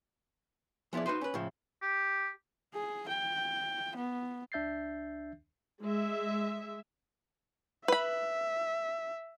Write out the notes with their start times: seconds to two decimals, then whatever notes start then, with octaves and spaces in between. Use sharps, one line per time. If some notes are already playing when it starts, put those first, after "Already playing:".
0.93 F3 B3 E4 G#4 D5
1.06 D#4 F#4 B4 C5
1.21 C#4 B4
1.34 A2 C#3 F3
1.82 G4
2.74 G#4
3.08 G5
3.96 B3
4.52 C#2 D4 E5 G6 A6 C7
5.83 G#3 E5
7.88 B4 E5 B5